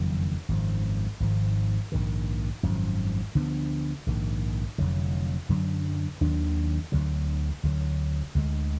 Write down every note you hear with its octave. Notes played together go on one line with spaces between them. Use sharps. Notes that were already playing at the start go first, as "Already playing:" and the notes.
Already playing: F#1 F2 D#3 F#3
G#1 F#2 F3
G#1 G#2 F3
A#1 G#2 D#3
G#1 F#2 F3
D2 D3 F3 B3
A#1 G#2 D#3
F1 F2 D3 F#3
F#2 D3 F#3 D4
D#2 D#3 F#3 D4
D2 D3 F#3
D2 D3 F#3
D2 D3 G#3